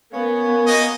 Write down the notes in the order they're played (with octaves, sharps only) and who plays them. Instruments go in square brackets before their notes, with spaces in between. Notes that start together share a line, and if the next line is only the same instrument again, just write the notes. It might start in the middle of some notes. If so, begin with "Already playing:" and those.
[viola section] B3 [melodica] C#4 C#5 [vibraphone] A#4 F5
[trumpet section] A#3 F#4 D#5